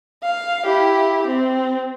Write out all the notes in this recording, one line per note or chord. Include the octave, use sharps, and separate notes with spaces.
F5
E4 G4
C4